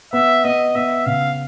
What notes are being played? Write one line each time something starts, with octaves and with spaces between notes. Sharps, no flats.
B3 E5
B3 D#5
B3 E5
C#3 F5